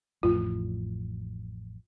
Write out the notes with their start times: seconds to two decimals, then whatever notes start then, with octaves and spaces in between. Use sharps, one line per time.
0.23 A1 F2 A2 F4